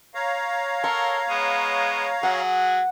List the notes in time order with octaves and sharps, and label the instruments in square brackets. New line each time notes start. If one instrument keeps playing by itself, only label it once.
[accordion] C#5 F5 A#5
[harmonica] A4 A#4 [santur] C#6
[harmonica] G#3 B3
[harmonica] F#3 G#4 [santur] F#5